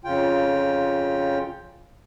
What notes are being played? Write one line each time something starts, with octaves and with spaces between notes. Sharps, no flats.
F2 C#3 F4 G5